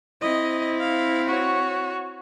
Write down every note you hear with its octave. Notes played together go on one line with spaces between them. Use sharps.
C4 E4 D#5
F5
F#4 C#5